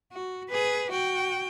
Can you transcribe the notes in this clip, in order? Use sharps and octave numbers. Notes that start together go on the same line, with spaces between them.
F#4
G#4 B4
F#4 G5